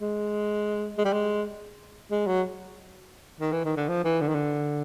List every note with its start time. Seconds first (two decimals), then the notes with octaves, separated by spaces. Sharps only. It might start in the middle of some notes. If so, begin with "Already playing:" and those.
0.01 G#3
0.98 G#3
1.05 G3
1.13 G#3
2.11 G#3
2.27 F#3
3.40 D#3
3.52 E3
3.65 D#3
3.77 D3
3.89 F3
4.04 E3
4.21 D3
4.28 D#3
4.35 D3